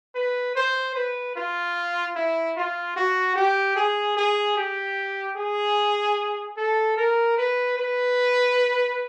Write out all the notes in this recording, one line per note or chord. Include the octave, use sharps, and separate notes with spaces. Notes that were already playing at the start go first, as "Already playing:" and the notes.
B4
C5
B4
F4
E4
F4
F#4
G4
G#4
G#4
G4
G#4
A4
A#4
B4
B4